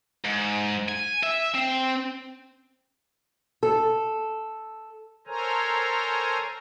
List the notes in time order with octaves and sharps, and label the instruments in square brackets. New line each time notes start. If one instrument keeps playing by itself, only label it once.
[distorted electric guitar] G#2
G#5
E5
C4
[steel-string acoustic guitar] A4
[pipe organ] A4 A#4 C5 C#5 G#5 A#5